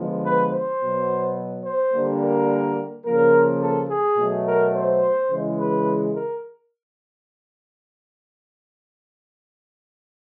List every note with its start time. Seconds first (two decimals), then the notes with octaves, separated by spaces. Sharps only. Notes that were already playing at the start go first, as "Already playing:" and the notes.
Already playing: D3 F3 G#3 B3
0.24 B4
0.52 C5
0.79 B2 F#3 B3
1.64 C5
1.92 D3 G3 A#3
2.20 A#4
3.04 C#3 F3 A#3 A#4
3.61 A4
3.89 G#4
4.16 B2 F#3 A3
4.45 A#4
4.73 C5
5.29 C#3 E3 G#3
5.57 B4
6.14 A#4